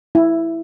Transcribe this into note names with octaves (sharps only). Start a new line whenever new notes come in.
E4